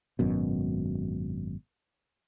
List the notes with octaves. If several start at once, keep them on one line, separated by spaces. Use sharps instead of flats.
G#1 F#2 B2